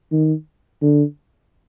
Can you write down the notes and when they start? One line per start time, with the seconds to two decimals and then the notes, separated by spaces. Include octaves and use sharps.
0.12 D#3
0.82 D3